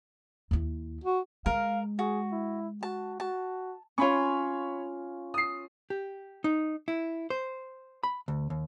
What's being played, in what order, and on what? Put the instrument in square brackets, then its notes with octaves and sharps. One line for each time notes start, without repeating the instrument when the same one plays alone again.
[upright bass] D#2 E4
[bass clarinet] F#4
[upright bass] G#3 [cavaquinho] A#4 [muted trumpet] F5
[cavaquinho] F#4 [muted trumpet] G#4
[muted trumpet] E4
[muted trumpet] F#4 [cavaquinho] A5
[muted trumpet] F#4 [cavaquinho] A5
[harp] C#4 F4 [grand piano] C#5 B5 C#6
[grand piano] D#6 C7
[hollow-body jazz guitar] G4
D#4
E4
C5
B5
D2
D#2